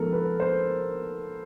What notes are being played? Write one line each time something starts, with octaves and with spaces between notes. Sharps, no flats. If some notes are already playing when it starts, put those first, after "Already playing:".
Already playing: F3 G#3 B3 D#4 A4 A#4
B4
C5